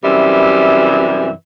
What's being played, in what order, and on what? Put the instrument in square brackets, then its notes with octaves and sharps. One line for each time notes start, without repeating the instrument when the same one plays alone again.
[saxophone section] F#2 C3 E3 G3 E5